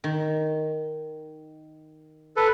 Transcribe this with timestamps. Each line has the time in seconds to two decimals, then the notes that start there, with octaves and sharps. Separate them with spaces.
0.04 D#3
2.36 A4 B4